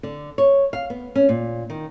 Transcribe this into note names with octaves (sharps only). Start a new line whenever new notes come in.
D3
C#5
F5
B3
C#4
A#2
D#3